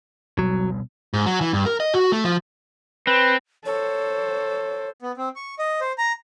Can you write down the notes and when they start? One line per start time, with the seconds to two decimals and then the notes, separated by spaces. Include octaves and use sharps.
0.39 B2 F#3 G3
1.14 G#2
1.26 F#3
1.41 E3
1.53 G2
1.66 A#4
1.80 D#5
1.94 F#4
2.12 A3
2.24 F3
3.07 C4 B4
3.65 A4 C5 C#5
5.02 B3
5.17 C4
5.36 C#6
5.59 D#5
5.81 C5
5.98 A#5